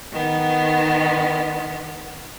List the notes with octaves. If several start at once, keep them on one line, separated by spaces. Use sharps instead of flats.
D#3 B3